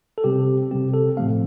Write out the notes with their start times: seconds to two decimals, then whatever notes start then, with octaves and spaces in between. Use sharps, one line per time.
0.18 A4
0.24 C3 G3 C4 G4
0.71 C3 G3 C4 G4
0.94 A4
1.17 A2 F3 A3 C4 F5